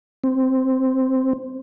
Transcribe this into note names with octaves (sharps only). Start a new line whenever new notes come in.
C4